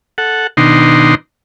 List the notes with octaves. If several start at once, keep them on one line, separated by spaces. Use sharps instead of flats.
A4 F#5
B2 D#3 D4 D#4 A#5 C6